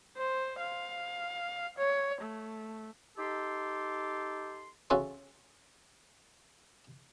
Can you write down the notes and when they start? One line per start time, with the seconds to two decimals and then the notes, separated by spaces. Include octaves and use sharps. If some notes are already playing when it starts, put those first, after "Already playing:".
0.17 C5
0.60 F5
1.78 C#5
2.22 A3
3.17 D#4 G4 A4 C6
4.90 C#3 F#4 A4 E5 G#5 C6